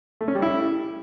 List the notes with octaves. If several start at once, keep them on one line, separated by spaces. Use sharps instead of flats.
A3
C#4
G3
E4